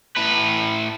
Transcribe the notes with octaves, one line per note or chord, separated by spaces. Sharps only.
A2 B4